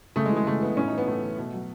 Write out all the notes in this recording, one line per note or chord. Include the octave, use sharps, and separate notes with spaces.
C#3 A3
G#3
E3
G#3
C#3 A3
E3 B3
A2 C#4
D#4
E3
B3
A2 A3
E3
B2
F#3